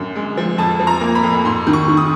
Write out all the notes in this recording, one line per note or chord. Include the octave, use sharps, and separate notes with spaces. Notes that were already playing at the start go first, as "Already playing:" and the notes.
Already playing: F#2 D3
G#3
F3
F2 A5
F3
A#5
A#3
B5
F2
G#2 C6
D#3
C#6
D#3
D#6